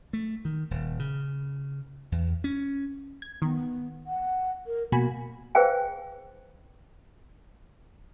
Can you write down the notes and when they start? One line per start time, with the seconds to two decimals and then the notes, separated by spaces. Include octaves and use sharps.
0.13 A3
0.45 D#3
0.71 D#1
0.99 C#3
2.12 E2
2.44 C#4
3.22 G#6
3.42 D#3 B3
4.06 F#5
4.67 A#4
4.92 B2 A#3 F#4 G#5 B5
5.55 G#4 B4 C5 F5 G5 G#5